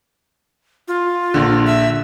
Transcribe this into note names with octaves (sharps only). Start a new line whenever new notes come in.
F4
A#1 D3
E5